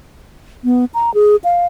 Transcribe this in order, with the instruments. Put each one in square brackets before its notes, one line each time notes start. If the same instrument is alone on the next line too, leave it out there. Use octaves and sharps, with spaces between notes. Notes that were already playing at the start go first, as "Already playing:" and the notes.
[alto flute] B3
A#5
G#4
F5